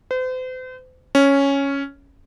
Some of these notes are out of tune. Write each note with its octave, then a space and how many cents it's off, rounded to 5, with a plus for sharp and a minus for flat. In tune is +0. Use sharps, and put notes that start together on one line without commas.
C5 -40
C#4 +0